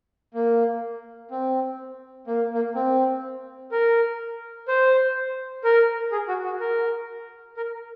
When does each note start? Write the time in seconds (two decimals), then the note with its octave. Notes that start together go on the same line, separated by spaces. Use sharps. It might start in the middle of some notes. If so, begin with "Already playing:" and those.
0.34 A#3
1.31 C4
2.27 A#3
2.54 A#3
2.75 C4
3.72 A#4
4.68 C5
5.64 A#4
6.12 G#4
6.28 F#4
6.44 F#4
6.60 A#4
7.57 A#4